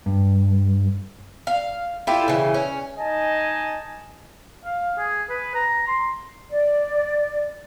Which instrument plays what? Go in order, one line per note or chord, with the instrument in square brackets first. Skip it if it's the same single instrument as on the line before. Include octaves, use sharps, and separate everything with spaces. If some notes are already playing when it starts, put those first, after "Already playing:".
[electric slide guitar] G2
[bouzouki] F5
E4 F4 G4 A4
C#3 E3
C#4
[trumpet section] D#4 D#5 G#5 A5
[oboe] F5
G#4
B4
A#5
C6
[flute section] D5